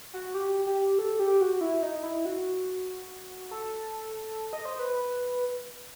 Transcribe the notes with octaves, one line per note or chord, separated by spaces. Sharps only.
F#4
G4
G4
A4
G4
F#4
E4
D#4
E4
F#4
A4
D#5
C5
B4